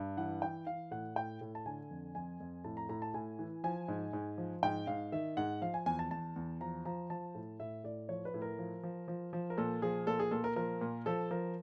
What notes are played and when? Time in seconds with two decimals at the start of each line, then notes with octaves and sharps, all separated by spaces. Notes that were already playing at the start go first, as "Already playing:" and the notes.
Already playing: G2
0.17 E3 F#5
0.42 E3 G5
0.66 E3 F5
0.91 A2 F#5
1.16 A2 G5
1.41 A2
1.55 A5
1.66 D3 G#5
1.90 F2
2.15 F2 G#5
2.40 F2
2.64 A2 A5
2.77 A#5
2.89 A2 A#5
3.02 A5
3.14 A2 G#5
3.39 E3
3.64 F3 G#5
3.88 G#2
4.13 G#2
4.38 F3
4.63 G#2 G5
4.87 G#2 F5
5.12 D#3 E5
5.37 G#2 F#5
5.61 F3 F5
5.74 G#5
5.86 E2 G#5
5.99 A5
6.11 E2 A5
6.36 E2
6.61 F3 A#5
6.85 F3 A#5
7.10 F3 A5
7.35 A2
7.59 A2 E5
7.84 A2 D5
8.09 F3 C#5
8.25 B4
8.34 A2
8.42 A#4
8.59 F3
8.83 F3
9.08 F3
9.33 F3
9.50 A#4
9.58 A#2 A4
9.82 F3 G#4
10.07 A#2 A4
10.19 G#4
10.31 A#2 A4
10.44 A#4
10.56 F3 A#4
10.81 A#2
11.06 F3 A4
11.31 F3 A#4